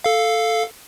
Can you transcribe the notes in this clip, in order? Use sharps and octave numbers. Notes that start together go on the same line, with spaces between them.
A4 F5